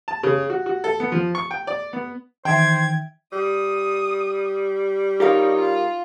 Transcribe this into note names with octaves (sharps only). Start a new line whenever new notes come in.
A5
C#3
F#4
F#4
A4
B3
F3
C#6
G5
D5
B3
D#3 E3 C5 E5 G5 G#6
G3 D#6
D#4 F4 G4 A#4 C#5 F5
F4